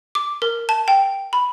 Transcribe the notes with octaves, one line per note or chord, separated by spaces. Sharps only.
D6
A#4
A5
G5
B5